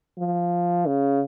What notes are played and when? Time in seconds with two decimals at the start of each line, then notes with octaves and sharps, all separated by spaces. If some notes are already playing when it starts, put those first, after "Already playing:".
0.19 F3
0.86 C#3